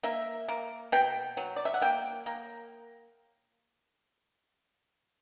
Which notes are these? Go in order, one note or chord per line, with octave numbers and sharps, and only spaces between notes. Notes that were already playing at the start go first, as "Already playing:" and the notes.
A#3 E5
A#3
B2 G5
F#3
D5
E5
F#5
A#3 G5
A#3